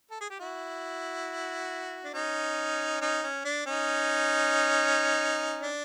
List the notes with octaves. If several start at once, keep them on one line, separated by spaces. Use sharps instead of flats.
A4
G#4
G4
E4 F#4
D4
C#4 D#4
C#4 D#4
C#4
D4
C#4 D#4
D4